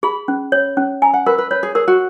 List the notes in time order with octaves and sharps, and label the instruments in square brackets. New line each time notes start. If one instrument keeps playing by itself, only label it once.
[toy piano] G#4 [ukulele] B5
[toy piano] C#4
C#5
C#4
[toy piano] G#5 [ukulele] A#5
[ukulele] F#5
[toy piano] A#4 [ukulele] B4
[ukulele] B4
[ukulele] B4 [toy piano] C#5
[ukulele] G#4
[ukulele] G#4 [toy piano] A#4
[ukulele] F#4